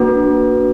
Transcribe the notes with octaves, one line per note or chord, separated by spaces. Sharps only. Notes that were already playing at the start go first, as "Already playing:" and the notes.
Already playing: A#3 D4 F#4 B4